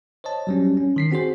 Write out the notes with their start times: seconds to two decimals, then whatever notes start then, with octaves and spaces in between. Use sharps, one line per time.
0.24 C5 C#5 D#5 A5
0.47 F#3 G3 C#4
0.77 C#4
0.96 D#3 B6 C7
1.11 C4 F#4 G#4 C5